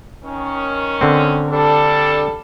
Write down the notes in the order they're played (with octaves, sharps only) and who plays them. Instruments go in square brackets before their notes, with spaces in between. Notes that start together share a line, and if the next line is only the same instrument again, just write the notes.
[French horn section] D#3 C#4
[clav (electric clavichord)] D3 C4
[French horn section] G3 D4 A4